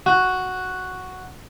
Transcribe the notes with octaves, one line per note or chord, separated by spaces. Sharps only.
F#4